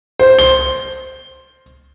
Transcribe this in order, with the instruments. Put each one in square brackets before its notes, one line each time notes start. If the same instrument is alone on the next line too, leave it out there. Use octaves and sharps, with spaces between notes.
[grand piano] C5
G7